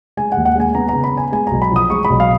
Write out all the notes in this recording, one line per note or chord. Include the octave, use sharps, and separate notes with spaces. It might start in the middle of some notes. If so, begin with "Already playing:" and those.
G#3 G#5
F#5
D#2
F#5
G#3 G#5
B3 A#5
C#3 A#5
B5
B3 G#5
G#3 G#5
B1 A#5
B5
F3 D#6
G#3 C#6
B5
B1
F5